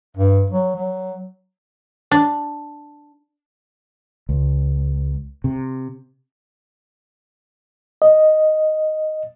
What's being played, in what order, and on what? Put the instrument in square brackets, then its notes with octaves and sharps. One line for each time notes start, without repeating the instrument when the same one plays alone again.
[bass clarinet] G2
F#3
F#3
[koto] D4
[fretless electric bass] C#2
C3
[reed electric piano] D#5